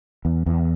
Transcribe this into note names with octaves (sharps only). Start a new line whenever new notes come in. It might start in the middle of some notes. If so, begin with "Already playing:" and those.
E2
E2